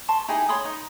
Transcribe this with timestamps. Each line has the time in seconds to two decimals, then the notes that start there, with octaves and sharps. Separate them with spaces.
0.08 A5 C6 C#6
0.28 D#4 E4 G4 G#4
0.49 C#5 B5 C6 D#6
0.65 D#4